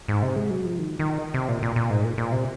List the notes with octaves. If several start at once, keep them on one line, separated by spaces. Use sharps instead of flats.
G#2
C3
G#3
F#3
F3
D#3
D#3
C3
A#2
A#2
A#2
G#2
A#2
A#2
C3